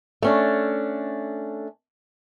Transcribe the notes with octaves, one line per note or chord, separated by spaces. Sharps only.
A3 C#4 D4